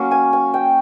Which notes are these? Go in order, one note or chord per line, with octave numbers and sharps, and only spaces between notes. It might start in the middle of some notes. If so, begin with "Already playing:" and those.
Already playing: F#3 A#3 C#4
G#5
G#5
G5